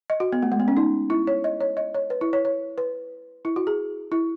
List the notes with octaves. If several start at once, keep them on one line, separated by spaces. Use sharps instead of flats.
D#5
F#4
B3
A3
G#3
B3
C#4
D#4
E4
C#5
D#5
C#5
D#5
C#5
B4
E4
C#5
C#5
B4
E4
F#4
G#4
E4